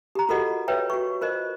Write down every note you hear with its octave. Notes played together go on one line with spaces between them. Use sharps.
G4 A#5
F4 F#4 A4 A#4 D#5 F#5
B4 C#5 E5 G5
F#4 C#6
F4 A#4 C5 D#5